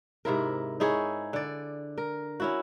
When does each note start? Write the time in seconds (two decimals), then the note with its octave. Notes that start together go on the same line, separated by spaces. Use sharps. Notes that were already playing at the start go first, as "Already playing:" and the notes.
0.25 G#2 C3 E4 A#4
0.80 D#4 E4 G#4 C#5
1.33 D3 D5
1.98 A#4
2.40 C#4 E4 F#4